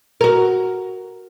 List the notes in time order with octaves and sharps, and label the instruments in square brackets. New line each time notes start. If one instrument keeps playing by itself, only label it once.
[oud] F#4 A#4